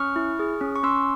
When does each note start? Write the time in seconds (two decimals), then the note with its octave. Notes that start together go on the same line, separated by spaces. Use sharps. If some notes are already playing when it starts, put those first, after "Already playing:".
Already playing: C#4 C#6 F6
0.16 E4
0.39 G#4
0.61 C#4
0.76 C#6
0.83 C#4 C6 E6